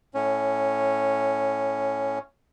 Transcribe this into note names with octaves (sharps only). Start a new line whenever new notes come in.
A2 C#4